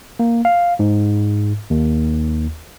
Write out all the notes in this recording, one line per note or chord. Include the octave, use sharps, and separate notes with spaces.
A#3
F5
G#2
D#2